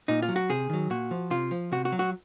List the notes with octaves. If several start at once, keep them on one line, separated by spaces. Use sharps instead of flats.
A#2 D#4
F4
F#3
F#4
C3 G#4
D#3 F#3
A#2 F#4
F3
C3 F4
F3
C3 F#4
F#4
F#3
F#4